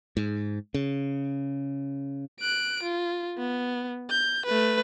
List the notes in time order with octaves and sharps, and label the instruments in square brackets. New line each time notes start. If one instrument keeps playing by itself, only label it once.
[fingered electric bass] G#2
C#3
[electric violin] F#6 D7
F4
B3
G6
A3 B4